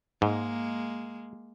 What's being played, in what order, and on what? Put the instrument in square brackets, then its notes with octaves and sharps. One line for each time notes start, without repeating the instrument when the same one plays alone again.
[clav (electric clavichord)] G#2 [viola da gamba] G#3 A#3